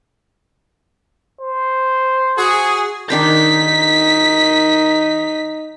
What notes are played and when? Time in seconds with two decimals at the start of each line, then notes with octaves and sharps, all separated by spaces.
1.41 C5
2.37 F#4 G#4
3.10 D#3 D4 D#4 C5 B6